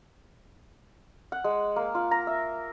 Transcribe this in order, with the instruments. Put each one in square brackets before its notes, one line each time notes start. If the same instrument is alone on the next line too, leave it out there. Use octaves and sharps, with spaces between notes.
[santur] F#5
G#3
A#3
F4
A#5
E5